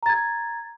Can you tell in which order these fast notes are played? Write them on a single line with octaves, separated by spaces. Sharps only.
A#5 A6 G#6